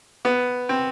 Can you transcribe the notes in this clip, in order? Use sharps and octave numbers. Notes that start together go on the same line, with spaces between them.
B3
C4